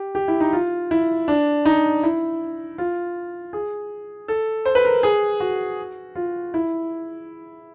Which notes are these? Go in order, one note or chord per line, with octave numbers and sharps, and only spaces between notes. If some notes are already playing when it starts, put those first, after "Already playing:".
Already playing: G4
G4
E4
D#4
F4
E4
D4
D#4
E4
F4
G#4
A4
C5
B4
A#4
G#4
F#4
F4
E4